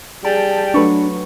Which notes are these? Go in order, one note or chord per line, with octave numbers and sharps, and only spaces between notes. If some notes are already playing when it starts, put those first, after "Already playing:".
G3 G#4 G5 A5
F#3 A3 D4 B4 C#6